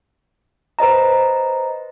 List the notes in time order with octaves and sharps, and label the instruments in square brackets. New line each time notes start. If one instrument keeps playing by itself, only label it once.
[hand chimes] B4 C5 D#5 A#5